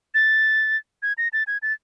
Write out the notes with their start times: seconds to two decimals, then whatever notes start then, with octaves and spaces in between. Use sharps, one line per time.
0.14 A6
1.03 G#6
1.18 A#6
1.33 A6
1.47 G#6
1.62 A6